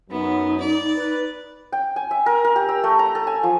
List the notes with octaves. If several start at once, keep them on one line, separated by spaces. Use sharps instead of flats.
F#2 F#3 B3 D#4
D5
B4
G5
G#5
E5
A#4
A#4
G4
E6
A3
A#5
A4
G#5
F3